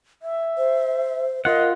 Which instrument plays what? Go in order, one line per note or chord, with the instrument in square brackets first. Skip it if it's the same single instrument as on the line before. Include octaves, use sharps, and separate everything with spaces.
[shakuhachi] E5
[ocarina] C5
[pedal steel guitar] F4 F#5 [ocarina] A#4 [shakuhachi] D#5